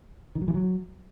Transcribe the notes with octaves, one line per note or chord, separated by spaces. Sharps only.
D#3
F#3
E3
F#3